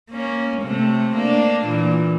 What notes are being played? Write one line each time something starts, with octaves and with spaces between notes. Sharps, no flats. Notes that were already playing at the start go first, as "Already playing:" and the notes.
A#3 C#4
C3 A3
A#3 D4
A#2 E3